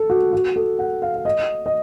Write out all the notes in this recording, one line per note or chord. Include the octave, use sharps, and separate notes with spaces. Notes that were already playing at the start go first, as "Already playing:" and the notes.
Already playing: A4
F#4
F#4
A4
F#5
F5
F5
D#5
D#5